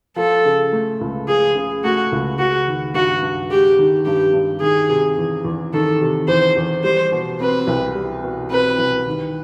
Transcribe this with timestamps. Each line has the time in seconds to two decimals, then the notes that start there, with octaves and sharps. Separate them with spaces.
0.16 F3 A4
0.45 C#3
0.73 A3
1.01 C#2
1.28 F3 G#4
1.55 C#3
1.84 A3 F#4
2.12 C#2
2.39 G#3 F#4
2.68 D#3
2.94 G2 F#4
3.23 G2
3.50 G#3 G4
3.79 D#3
4.06 G2 G4
4.33 G2
4.61 D#3 G#4
4.89 C3
5.17 E2
5.45 E2
5.73 D#3 A4
6.01 C3
6.28 E2 C5
6.57 E2
6.84 G3 C5
7.12 B2
7.40 C4 B4
7.67 C2
7.95 G3
8.24 B2
8.51 C4 B4
8.79 C2
9.07 D#3